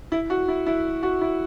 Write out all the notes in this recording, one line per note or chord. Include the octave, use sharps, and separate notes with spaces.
E4
F#4
E4
E4
F#4
E4